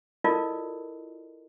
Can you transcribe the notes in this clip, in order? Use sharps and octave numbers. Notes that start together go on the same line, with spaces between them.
E4 F4 A4 A#4 D5 D#5